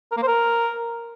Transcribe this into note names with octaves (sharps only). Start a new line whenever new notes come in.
A#4
A#3
C5
A#4